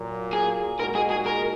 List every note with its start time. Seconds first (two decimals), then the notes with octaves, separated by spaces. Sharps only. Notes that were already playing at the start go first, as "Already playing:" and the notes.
Already playing: A#2 F#3 A#3
0.33 G#4
0.80 A#2 G#3 D#4 F#4 A#4
0.95 G#4
1.11 G#4
1.26 A#4